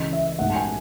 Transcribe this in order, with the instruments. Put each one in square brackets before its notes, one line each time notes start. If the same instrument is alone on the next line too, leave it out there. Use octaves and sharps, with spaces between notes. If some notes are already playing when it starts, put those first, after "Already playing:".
Already playing: [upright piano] C#2 C#3 E3 D#5
E5
B1 A2 G#3 F#5
A5
G#5